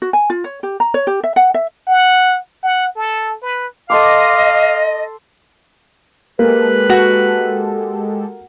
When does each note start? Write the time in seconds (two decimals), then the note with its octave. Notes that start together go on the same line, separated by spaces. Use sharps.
0.02 F#4
0.13 G#5
0.30 F4
0.44 C#5
0.63 G4
0.80 A#5
0.94 C#5
1.07 G4
1.24 E5
1.36 F#5
1.54 E5
1.87 F#5
2.63 F#5
2.96 A4
3.42 B4
3.90 A4 D#5 F5 C6 D6
6.39 G#3 A#3 G4 A4 B4
6.90 F#4